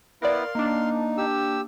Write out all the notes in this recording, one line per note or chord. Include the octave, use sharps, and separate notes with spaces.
B3 E4 A#4 B4 D5 F5 C6
A#3 D4 D#4
G4 E6